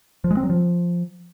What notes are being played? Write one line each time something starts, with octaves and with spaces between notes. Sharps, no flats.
F3
G#3
C4
F#3
F3